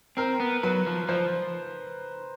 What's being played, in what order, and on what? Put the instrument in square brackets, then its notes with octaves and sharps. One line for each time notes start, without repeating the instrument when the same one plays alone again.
[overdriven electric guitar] C4 [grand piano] A#4
[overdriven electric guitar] B3
[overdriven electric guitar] F#3 [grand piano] B4
[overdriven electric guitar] F3
[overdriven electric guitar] F3 [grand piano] C5